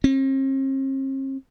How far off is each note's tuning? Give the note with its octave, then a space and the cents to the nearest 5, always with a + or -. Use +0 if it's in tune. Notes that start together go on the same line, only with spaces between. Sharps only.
C4 +45